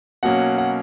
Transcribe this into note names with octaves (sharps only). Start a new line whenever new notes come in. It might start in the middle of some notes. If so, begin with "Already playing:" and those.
B2 F#3 A#3 C#4 F#5
F#5